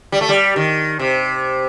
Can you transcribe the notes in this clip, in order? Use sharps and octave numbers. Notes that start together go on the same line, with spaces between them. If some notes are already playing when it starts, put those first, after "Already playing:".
G3
A3
G3
D#3
C3